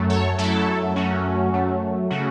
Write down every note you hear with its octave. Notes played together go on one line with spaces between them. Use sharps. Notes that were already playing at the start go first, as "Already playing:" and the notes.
Already playing: F#2 F#3 A3
A4 C#5
F#2 F#3 A3 E4 A4
F#2 F#3 A3 C#4 F#4
F#2 F#3 A3
C#3 A3 C#4 F#4